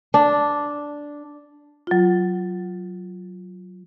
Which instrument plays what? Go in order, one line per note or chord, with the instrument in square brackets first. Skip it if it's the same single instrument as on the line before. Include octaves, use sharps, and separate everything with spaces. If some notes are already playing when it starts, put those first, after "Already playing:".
[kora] D4
[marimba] F#3 F4